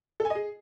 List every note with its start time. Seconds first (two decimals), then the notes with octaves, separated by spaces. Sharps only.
0.20 A4
0.25 G#5
0.30 D#5
0.35 G#4